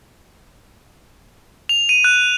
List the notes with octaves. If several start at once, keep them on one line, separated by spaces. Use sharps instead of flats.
F7
D#7
F#6